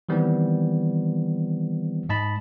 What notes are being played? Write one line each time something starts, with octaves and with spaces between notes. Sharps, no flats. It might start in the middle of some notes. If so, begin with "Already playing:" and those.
D#3 E3 G3 B3 C4
G#2 D#5 A5 B5